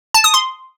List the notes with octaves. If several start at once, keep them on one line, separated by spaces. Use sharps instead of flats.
A5
D#6
C6